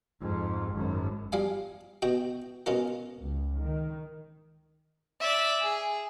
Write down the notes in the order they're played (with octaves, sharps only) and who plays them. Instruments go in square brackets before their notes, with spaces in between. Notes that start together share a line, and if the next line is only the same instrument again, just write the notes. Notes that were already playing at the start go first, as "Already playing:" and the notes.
[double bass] F2 G#2
G#1 F#2
[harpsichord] F3 G3 F5 G#5
B2 F#4 G5
B2 C#4 F4 A#4
[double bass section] C#2
D#3
[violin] D5 E5
G#4